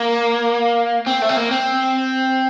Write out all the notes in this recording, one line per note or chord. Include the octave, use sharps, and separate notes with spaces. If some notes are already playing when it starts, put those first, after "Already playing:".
Already playing: A#3
C4
A3
C4
A#3
C4